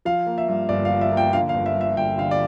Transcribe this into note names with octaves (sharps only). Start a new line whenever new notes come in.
F3 F5
A#3
E5
G2
G1 D5
F5
F3
E5
A#3
G5
D3 F5
F5
G1
E5
G2 E5
G1 G5
D3 F5
D5